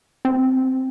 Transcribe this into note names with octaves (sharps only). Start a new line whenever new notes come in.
C4